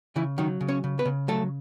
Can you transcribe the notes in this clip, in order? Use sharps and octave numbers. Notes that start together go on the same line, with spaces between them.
C#3 E3 E4
D#3 F#3 D#4
C#3
C#4 C#5
C#3
B3 B4
C#3
F#3 A3 A4